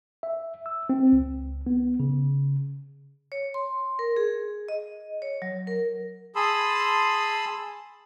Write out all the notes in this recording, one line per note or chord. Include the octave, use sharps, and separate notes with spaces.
E5
E6
C4
C#2
B3
C#3
C#5
C6
A#4
G#4
D#5
C#5
F#3
A#4
G#4 A5 B5 C6 D#6 E6